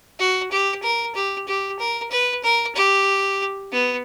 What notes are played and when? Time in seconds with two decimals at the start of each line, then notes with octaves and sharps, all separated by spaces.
0.19 F#4
0.51 G4
0.83 A#4
1.15 G4
1.48 G4
1.79 A#4
2.11 B4
2.43 A#4
2.75 G4
3.72 B3